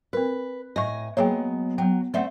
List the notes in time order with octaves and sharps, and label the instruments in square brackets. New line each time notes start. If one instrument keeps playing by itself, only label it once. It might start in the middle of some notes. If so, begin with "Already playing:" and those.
[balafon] C4 A#4 [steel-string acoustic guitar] B4
[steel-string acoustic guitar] A2 G#5 [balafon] D#5 C#6 [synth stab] A#6
[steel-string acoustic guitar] F#3 G#3 B3 [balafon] A#3 G#4 G5 [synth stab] C#5
[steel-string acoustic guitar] F#3 [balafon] B3 G5
[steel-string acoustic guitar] A3 C4 [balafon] D5 E5 F#5